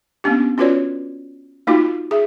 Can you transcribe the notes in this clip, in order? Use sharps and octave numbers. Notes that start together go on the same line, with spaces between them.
A#3 B3 C#4 D4 G4
C#4 F4 F#4 B4 C#5 D5
A#3 D#4 F4 F#4
G#4 E5